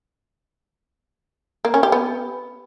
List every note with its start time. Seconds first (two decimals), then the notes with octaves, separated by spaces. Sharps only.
1.65 A#3
1.74 C#4
1.83 G4
1.92 B3